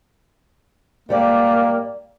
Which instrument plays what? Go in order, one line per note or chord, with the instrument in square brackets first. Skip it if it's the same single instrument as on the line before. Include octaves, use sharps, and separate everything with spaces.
[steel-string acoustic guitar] G#2 G3 D5 [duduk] A#3